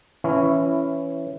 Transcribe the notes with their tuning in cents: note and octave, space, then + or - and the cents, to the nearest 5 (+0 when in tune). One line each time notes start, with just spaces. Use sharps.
E3 +15 C#4 +0 E4 +5